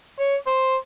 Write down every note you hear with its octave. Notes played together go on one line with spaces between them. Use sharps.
C#5
C5